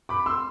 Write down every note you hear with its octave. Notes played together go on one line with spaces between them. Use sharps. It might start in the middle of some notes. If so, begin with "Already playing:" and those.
B5 D6
C6 E6